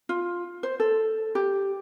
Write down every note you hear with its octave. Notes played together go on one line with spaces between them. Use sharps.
F4
C5
A4
G4